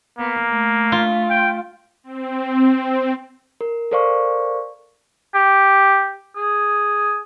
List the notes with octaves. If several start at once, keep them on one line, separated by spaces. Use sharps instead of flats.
A#3 B3
A3
F4
G5
C4
A#4
A4 A#4 C5 D5 F5 C#6
G4
G#4